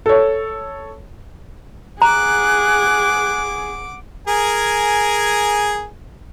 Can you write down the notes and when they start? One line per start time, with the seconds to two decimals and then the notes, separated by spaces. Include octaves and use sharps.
0.06 A4 C#5
2.02 G#4 F#5 A#5 D6 F#6
4.28 G#4 A#4 G#5